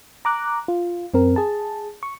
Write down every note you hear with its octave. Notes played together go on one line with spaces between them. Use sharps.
A#5 D6 F#6
F4
F#2 C4 A#4
G#4 A5
C#6